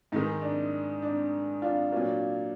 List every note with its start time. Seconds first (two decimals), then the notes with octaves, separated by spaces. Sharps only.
0.12 G#2 D#3 G#3 D#4
0.42 D4
1.02 D4
1.62 D4 F4
1.92 A#2 F#3 D4 F4